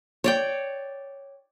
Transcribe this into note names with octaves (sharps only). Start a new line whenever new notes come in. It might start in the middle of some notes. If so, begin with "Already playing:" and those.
C#5 D5 G5